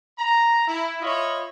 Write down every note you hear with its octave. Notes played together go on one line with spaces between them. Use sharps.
A#5
E4
F4 C#5 D#5 E5 B5